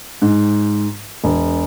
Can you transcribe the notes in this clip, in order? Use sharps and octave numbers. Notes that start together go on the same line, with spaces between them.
G#2
E1